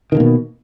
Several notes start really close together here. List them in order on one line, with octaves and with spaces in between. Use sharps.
D#3 D3 A#3 B2